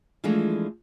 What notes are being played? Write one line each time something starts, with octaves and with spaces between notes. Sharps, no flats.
E3 F3 G#3 A3 D4 F4